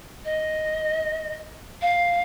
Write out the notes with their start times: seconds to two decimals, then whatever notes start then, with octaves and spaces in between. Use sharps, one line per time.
0.25 D#5
1.81 F5